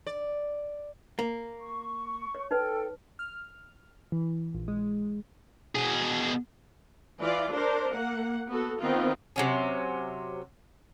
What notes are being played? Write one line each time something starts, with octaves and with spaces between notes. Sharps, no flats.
D5
A#3
C#6
C#5
D#4 A4 B4 C5 G5
F6
E3
A#1
G#3
B2 G#4
E3 F4 D5
D4 A#4 C5
A#3 F#5
B3 F#4 A4
D#3 F3 B3 C4 F4
C3 F#3 C#4